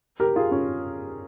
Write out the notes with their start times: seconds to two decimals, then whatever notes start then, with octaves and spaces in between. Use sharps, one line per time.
0.20 G4 A#4
0.36 F4 G#4
0.52 C#4 F4